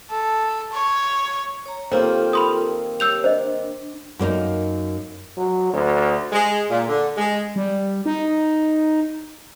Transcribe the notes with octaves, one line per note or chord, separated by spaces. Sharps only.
A4
C#5
C#5 A#5
D#3 A#3 C4 F4 G4 A4 A#4 C5
B5 C6 D#6
G4 C#5 E6 G6 F7
D4 C5 D#5
F#2 A#3 D4 D#4
F#3
D2
G#3
A#2
D3
G#3
G3
D#4